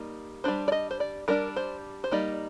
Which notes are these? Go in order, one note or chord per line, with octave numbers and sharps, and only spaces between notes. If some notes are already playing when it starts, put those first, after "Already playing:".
Already playing: G3 A#3 D#4
G3 D4 C5
D5
D#5
C5
D5
G3 D4 A#4
C5
C5
G3 A#3 D#4 D5